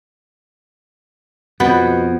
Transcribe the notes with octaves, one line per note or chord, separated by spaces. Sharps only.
F2 B2 B3